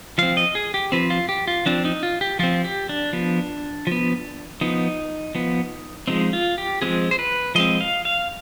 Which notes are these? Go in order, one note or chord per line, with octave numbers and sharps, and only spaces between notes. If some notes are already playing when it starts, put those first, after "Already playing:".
F3 C4 F5
D#5
G#4
G4
F3 C4 B4
F4
G4
F4
F3 C4 D4
D#4
F4
G4
F3 C4 F4
G4
D4
F3 B3
F3 B3
F3 B3 D#4
F3 B3
F3 G#3 C4 D#4
F4
G4
F3 G#3 C4 G#4
C5
B4
F3 G#3 C4 D#5
F5
F5